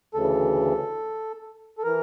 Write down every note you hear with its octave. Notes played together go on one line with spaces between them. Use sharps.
D2 C#3 E3 A4
A4
E3 A#4